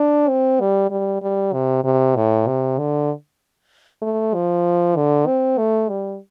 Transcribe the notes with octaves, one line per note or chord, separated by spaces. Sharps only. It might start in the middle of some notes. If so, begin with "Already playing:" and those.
Already playing: D4
C4
G3
G3
G3
C3
C3
A2
C3
D3
A3
F3
D3
C4
A3
G3